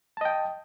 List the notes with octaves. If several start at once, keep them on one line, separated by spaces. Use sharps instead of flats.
D#5 G5 A5